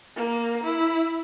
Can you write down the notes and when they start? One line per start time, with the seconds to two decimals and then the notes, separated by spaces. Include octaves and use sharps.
0.16 A#3
0.63 E4